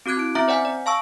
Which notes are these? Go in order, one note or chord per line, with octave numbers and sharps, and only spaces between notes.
C4 F#4 D6 F#6 G#6
E4 D7
C4 C#4 E5 A#5 D6
C5 D5 F#5 G#5
D5
F5 A5 C#6 E6